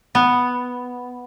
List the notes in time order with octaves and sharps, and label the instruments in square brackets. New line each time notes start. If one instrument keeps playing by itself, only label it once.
[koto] B3